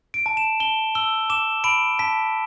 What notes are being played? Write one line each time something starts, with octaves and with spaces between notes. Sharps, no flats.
D7
A5
E7
A5 G7
E6 G7
D6 E7
B5 D7
A5 B6